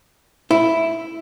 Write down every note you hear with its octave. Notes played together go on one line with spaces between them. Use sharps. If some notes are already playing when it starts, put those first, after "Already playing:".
E4